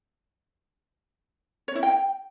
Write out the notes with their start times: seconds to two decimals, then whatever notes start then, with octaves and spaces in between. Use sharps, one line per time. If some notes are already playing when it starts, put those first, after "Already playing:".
1.68 C#5
1.75 E4
1.83 G5